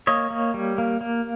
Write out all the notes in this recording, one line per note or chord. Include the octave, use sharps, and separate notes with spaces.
A#3 C#5 D#5
A#3
G3
A#3
A#3